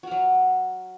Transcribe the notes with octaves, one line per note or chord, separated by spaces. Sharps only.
F#3 F#4 A#4